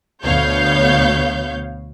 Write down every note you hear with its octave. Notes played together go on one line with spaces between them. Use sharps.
D2 B2 B3 C#5 F5 G6